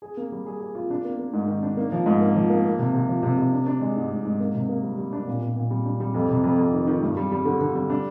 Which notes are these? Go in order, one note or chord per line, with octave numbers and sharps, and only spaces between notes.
G#4
A#3
G3
G#4
G#4
F4
D4
A#3
A#3
G#2
D#3
D4
A#3
F3
G#2
A#3
F3
A#3
A#3
C3
C3
F3
C3
C3
D4
D4
G#3
G#2
G#2
G#2
A#3
C3
A#3
G3
G3
D4
A#2
A#2
A#2
G3
D4
G3
F2
C3
F2
F2
D#3
D#3
G2
G3
G3
D3
D3
G3
D4